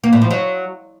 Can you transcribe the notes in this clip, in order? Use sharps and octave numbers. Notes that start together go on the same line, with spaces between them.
A#3
A2
F3
F#3